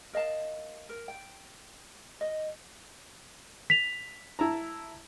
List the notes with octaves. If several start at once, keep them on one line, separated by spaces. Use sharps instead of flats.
A#4 D#5 F5 A5
A#4
G5
D#5
B6 F7
E4 A5 A#5